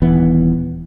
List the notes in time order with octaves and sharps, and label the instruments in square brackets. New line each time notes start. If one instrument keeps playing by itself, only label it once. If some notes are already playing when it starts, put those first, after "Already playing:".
[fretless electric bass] D#1 E3 B3